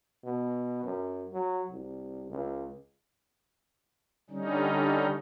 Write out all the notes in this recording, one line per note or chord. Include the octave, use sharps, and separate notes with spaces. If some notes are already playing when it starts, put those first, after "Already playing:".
B2
F#2
F#3
C2
C#2
D3 G3 C#4 D#4